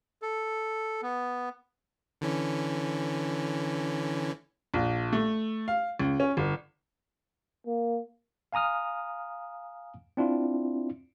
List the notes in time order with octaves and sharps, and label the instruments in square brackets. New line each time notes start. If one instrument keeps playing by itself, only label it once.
[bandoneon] A4
B3
[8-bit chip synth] D3 E3 C#4
[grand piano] A#1
A3
F5
C#2
C#4
G1
[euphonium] A#3
[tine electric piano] F5 G#5 A#5 D#6 F6
C4 D4 E4 F4